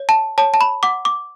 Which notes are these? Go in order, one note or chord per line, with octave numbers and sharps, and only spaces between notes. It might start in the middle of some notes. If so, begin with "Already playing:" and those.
Already playing: C#5
A5
C#5 A5
A5
B5
F#5 D6
D6